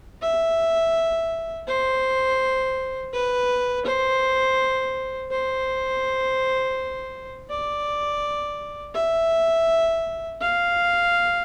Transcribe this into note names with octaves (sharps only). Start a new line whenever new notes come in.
E5
C5
B4
C5
C5
D5
E5
F5